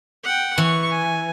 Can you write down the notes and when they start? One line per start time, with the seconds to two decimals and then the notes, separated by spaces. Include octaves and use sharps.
0.24 F#5 G5
0.58 E3 C#6
0.90 G#5